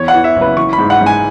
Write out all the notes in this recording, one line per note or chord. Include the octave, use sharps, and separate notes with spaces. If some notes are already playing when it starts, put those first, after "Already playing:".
Already playing: E2 C#5
F#5
E3
E5
F#1
B4
E3 C#6
B5
G#2
F#5
G#2
G#5